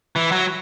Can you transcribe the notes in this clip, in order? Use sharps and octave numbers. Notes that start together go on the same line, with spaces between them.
E3
F#3